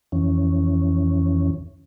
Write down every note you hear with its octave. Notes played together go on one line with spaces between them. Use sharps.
F2 E3 C#4